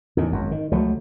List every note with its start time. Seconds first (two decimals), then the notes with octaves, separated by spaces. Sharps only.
0.17 E2 A2 D#3
0.32 G#1 F#2
0.51 D#3
0.71 C#2 F3 F#3 A3